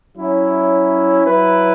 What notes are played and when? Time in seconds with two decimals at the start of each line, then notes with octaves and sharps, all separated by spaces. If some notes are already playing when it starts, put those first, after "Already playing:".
0.15 F#3 C#4 E4
1.26 F#3 E4 B4